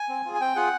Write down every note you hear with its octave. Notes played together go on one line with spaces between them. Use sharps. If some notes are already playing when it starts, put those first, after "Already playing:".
Already playing: G#5
C4
F4 G#4
G#5
C4 G5
F4 G#4 F#5